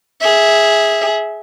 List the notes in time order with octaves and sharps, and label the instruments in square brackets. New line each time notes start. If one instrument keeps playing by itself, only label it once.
[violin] G#4 E5